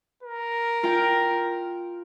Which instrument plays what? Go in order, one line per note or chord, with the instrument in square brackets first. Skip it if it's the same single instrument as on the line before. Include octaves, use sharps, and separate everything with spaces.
[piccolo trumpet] A#4
[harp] F4 G5